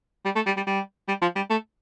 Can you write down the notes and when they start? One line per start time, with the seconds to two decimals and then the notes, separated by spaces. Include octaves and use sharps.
0.25 G3
0.35 A3
0.46 G3
0.56 G3
0.67 G3
1.08 G3
1.22 F3
1.36 G3
1.50 A3